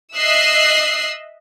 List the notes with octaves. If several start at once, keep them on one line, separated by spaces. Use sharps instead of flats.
D#5 E5 D#6 E6 F#6 C7